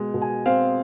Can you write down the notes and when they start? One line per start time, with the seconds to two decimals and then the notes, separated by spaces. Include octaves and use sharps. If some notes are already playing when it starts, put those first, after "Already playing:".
Already playing: B2 G#3
0.14 B2
0.21 G#5
0.46 C4 F5